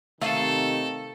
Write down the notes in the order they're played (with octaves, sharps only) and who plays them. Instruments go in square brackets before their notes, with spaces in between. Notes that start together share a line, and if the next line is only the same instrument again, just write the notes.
[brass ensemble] C3 D#3 D#4 [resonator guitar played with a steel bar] A3 F5 [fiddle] A4